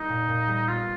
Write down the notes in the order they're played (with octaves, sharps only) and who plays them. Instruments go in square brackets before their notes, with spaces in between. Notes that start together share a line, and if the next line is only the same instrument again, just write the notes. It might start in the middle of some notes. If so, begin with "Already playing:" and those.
Already playing: [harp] G3 A#3 [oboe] D#4
[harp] A#2
A#2
G3
[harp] B3 [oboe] F4